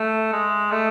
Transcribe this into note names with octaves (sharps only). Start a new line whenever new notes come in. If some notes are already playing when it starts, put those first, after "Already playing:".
Already playing: A3
G#3
A3